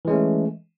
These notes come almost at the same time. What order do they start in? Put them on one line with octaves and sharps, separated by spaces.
E3 G#3 C#4 A3